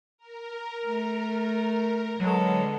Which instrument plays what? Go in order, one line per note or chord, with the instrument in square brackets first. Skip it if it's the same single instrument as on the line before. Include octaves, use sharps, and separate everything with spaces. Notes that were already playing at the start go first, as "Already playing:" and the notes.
[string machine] A#4
[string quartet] A3
[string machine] D3 [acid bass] F#3 [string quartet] G#3 B3 A4